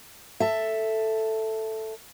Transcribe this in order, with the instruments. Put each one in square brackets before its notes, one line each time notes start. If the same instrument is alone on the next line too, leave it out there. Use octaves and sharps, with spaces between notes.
[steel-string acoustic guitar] A4 E5